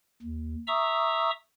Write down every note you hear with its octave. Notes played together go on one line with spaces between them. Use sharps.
D#2
E5 A#5 C#6 D#6 E6